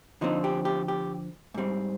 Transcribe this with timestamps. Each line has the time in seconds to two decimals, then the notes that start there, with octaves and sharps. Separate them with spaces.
0.21 D3 F3 C4 D#4
0.44 G4
0.65 G4
0.88 G4
1.54 G#2 G3 C4